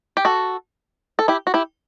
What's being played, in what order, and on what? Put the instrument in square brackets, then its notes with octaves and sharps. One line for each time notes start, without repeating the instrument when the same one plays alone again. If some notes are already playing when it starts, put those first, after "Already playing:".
[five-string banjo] G4
F#4 A4
A4
E4 G4
F#4
E4 G4